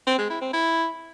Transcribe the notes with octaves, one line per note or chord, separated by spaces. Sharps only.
C4
G#3
E4
C4
E4